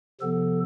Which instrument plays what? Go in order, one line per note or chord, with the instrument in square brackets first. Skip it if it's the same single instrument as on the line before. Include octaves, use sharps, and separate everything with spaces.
[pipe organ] C3 F3 B3 A4